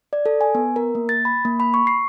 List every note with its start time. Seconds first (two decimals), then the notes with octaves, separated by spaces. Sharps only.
0.13 D5
0.26 A4
0.41 G#5
0.55 B3
0.76 A#4
0.95 A#3
1.09 A6
1.25 B5
1.45 A#3
1.60 B5
1.74 C#6
1.87 C7